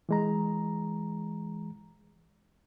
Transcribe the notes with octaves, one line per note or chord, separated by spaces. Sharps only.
E3 G#3 A#5